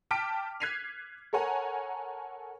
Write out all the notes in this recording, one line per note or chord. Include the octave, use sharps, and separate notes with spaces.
G5 A5 D6 F6 B6 D7
F#6 G#6 B6 C7 D#7 F7
A4 A#4 C#5 F#5 G#5 A#5